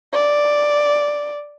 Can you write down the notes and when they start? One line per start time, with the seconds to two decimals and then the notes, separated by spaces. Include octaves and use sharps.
0.13 D5